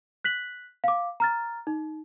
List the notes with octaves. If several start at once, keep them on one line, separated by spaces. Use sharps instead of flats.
F#6 B6 F#7
F5 D6
A#5 F6 A6
D#4